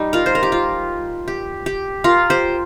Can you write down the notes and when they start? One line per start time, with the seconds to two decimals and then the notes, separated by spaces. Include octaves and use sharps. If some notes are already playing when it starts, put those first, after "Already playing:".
Already playing: G3 D#4
0.13 F4 A#4
0.26 C5
0.35 A#4
0.43 G4
0.52 F4
1.28 G4
1.66 G4
2.04 F4 A#4
2.30 G4 C5